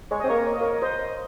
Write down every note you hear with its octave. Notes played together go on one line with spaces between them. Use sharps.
G#3 C#5
D#5
C4
A#3 A#4 C#5
C#5
D#5
A#4 C#5
C5 D#5